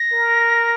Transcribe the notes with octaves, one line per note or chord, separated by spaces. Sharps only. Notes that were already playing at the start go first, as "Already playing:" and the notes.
Already playing: A#6
A#4